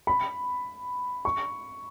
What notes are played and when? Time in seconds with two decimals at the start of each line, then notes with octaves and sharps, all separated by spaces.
0.07 B5
1.25 C#6